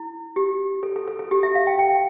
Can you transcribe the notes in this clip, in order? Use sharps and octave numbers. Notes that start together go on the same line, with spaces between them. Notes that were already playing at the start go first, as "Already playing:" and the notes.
Already playing: E4
G4
A4
A4
A4
A4
G4
E5
F5
G5
G5